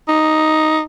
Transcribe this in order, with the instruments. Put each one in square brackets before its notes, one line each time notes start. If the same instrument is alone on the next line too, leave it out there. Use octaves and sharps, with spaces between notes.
[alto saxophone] D#4